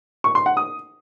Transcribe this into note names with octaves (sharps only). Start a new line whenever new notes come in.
C#6
C6
F#5
D#6